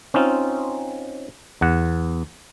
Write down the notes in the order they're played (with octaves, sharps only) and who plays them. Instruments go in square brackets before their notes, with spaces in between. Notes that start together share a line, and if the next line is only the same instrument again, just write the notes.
[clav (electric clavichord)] C4 C#4 D#4 F4
E2 F#5